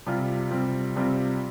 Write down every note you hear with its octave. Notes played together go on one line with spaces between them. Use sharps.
C3 G3 C4 F4
C3 G3 C4 F4
C3 G3 C4 F4